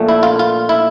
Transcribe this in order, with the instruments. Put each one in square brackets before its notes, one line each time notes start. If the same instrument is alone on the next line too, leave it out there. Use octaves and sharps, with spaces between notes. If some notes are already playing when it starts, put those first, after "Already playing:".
Already playing: [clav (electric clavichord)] A#1 A#2 A3
E4
F4
F4
E4